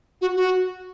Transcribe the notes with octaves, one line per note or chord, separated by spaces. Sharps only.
F#4
F#4